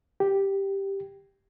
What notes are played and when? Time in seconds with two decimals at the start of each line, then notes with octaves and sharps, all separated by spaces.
0.20 G4